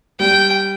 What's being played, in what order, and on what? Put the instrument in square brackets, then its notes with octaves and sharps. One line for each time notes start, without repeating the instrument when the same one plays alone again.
[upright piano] G3 [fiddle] G5